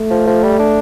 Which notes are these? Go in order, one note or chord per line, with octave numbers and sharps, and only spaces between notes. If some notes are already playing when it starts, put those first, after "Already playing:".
Already playing: A3
F3
F3
G3
D4